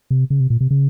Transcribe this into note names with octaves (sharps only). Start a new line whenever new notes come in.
C3
C#3
C3
A#2
C3
C#3